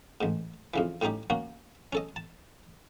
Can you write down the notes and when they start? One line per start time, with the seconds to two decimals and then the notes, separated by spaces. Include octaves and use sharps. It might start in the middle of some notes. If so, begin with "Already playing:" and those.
0.21 A1 G#2
0.74 F2 C#3 E3
1.02 A2 G3 C#4 D#4 G4
1.30 A#3 C#4 F#4
1.93 C#4 A4 D#5
2.16 A5